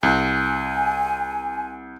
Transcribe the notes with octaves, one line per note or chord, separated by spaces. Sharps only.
C2 G#5